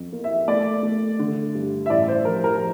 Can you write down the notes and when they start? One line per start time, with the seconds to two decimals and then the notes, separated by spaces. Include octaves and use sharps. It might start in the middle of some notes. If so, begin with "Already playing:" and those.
Already playing: F2
0.12 A#3
0.24 E5
0.48 A3 D5
0.83 A3
1.19 D3
1.54 G2
1.86 E5
1.90 A1 D5
2.08 C5
2.25 F3 A#4
2.44 A#4